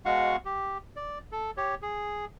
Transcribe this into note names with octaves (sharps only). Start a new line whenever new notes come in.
B2 G#3 F#4 F5 F#5 C#6
G4
D5
A4
G4 C#5
G#4